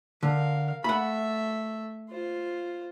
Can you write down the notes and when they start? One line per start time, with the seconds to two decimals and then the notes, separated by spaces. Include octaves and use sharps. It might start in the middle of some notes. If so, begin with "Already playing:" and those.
0.23 D3 A#4 F5
0.84 A3 E5 F#5 B5
2.10 F4 C5